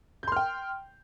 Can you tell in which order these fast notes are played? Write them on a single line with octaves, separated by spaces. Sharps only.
G6 C6 F6 G5